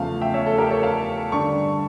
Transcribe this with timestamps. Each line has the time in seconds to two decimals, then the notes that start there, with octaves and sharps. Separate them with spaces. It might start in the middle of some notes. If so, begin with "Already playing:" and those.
Already playing: E2 C#3 F3 A3 F5 A5
0.21 E5 G5
0.34 C#5 E5
0.46 A4
0.58 G4 A#4
0.71 A4 C#5
0.83 F5 A5
1.32 G2 D3 G3 A5 C#6